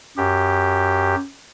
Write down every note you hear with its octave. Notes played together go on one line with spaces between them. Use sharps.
F#2 G4